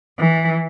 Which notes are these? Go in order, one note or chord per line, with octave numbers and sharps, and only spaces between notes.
E3